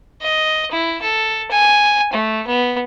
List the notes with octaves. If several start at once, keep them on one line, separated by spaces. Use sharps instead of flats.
D#5
E4
A4
G#5
A3
B3